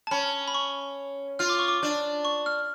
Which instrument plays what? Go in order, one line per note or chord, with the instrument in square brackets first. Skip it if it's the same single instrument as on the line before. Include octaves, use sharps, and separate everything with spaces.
[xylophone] A5
[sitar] C#4 [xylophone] B5
[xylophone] B5
C#6
[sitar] F4 [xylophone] F6
[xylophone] D6
C#6
D6
[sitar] D4
[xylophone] C#6
F6